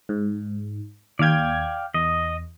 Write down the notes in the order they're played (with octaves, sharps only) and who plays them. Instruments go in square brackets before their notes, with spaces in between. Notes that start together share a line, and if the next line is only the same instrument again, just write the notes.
[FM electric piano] G#2
[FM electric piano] D#2 G#6 [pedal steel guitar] D5 F5 G5
[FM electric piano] E2 [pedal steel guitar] D#5